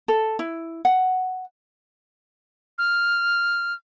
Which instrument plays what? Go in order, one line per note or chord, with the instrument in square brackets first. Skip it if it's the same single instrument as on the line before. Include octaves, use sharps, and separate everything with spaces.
[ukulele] A4
E4
F#5
[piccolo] F6